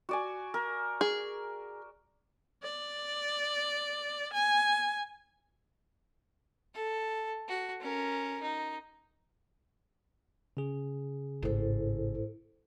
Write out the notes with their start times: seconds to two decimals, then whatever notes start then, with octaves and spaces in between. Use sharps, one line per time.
0.09 F#4 D5 G#5
0.54 A#4
1.01 G#4
2.63 D5
4.33 G#5
6.74 A4
7.48 F#4
7.81 C#4 A#4
8.42 D#4
10.57 C#3 G#4
11.43 G#1 A2 E4 A4 C5